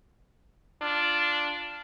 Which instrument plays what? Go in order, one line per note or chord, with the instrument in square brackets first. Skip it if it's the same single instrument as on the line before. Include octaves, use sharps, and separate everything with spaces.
[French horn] D4 [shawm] F4